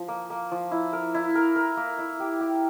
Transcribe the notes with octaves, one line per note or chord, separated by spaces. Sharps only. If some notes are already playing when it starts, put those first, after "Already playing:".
Already playing: F3
A#3
A#3
F3
E4
A#4
E4
A#4
A#4
A#3
E4
G4
G4